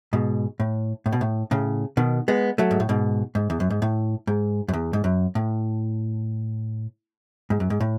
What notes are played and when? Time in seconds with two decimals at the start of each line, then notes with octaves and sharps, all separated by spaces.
0.13 G#2 B2
0.60 A2
1.06 A2
1.12 B2
1.21 A2
1.51 A2 C#3
1.97 B2 D#3
2.28 G#3 B3
2.58 F#3 A3
2.71 G#2
2.80 A2
2.89 G#2 B2
3.35 G#2
3.50 E2
3.60 F#2
3.70 G#2
3.82 A2
4.27 G#2
4.68 F#2
4.73 E2
4.93 G#2
5.04 F#2
5.35 A2
7.50 G#2
7.60 F#2
7.70 G#2
7.80 A2